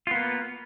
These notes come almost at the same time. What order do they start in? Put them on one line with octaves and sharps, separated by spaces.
F4 B3 A#3